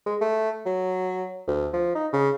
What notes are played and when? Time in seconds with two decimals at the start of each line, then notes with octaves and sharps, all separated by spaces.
0.06 G#3
0.21 A3
0.66 F#3
1.47 D2
1.73 F3
1.95 D#4
2.13 C#3